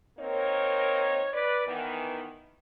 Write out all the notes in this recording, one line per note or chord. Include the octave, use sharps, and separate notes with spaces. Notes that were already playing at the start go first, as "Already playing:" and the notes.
A#3 C4 D#4 A#4 C#5
B4 D5
D#3 E3 B3